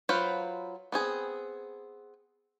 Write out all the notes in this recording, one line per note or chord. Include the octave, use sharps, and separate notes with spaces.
F#3 F4 B4 C5
B3 C4 G#4